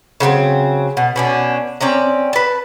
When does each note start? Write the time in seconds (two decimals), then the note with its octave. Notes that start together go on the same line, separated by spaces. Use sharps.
0.20 C#3 F#3 B3 C4
0.97 B2
1.16 B2 C#4 D4
1.81 C4 C#4 D5 A#5
2.33 B4 A5